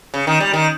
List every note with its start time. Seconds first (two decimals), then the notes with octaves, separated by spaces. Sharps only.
0.14 C#3
0.27 D#3
0.40 G3
0.53 D#3